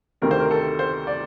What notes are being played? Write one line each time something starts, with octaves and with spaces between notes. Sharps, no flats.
D2 C3 D#3 A3 C4 A#4
C5
A#4
A4
C5
D5